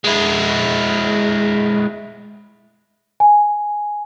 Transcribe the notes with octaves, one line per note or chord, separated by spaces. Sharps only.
G#3 E4
G#5